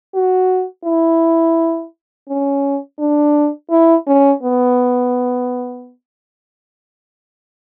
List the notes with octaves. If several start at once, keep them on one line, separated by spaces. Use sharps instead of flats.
F#4
E4
C#4
D4
E4
C#4
B3